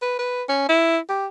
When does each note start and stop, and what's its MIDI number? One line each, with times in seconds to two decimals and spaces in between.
0.02 0.17 71
0.19 0.43 71
0.49 0.67 61
0.69 0.98 64
1.09 1.26 67